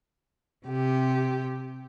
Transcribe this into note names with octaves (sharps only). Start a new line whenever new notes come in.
C3 G4